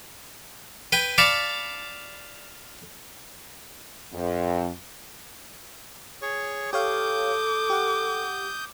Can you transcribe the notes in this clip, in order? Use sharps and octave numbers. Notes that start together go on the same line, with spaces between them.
B4 G5 G#5
D5 F5 A5 B5 C#6 D6
F2
G#4 C#5 C#6
G4 A4 C#5 F5 D6 D#6 G6
G4 F#5